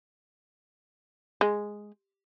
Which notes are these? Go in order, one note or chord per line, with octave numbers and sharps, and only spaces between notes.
G#3